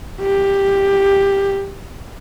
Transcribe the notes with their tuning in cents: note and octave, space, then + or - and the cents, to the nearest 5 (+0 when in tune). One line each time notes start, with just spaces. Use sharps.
G4 +10